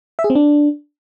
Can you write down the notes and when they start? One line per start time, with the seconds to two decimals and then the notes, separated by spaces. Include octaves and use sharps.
0.19 E5
0.24 G#4
0.30 C4
0.35 D4